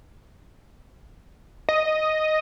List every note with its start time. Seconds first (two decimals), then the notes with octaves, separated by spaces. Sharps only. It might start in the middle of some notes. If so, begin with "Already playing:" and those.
1.69 D#5